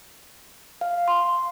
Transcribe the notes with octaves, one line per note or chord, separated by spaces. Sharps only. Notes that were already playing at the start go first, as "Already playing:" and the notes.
F5
C6